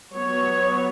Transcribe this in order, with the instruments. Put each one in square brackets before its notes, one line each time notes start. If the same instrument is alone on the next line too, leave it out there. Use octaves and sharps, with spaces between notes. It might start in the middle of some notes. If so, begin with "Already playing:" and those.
[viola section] F#3 B3 C#5